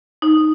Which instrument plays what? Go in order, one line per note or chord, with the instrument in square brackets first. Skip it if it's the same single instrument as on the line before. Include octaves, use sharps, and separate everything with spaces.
[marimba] D#4